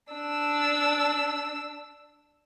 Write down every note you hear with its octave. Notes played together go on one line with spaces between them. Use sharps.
D4 E6